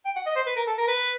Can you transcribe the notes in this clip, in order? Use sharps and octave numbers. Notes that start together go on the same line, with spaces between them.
G5
F#5
D#5
C5
B4
A#4
A4
A#4
B4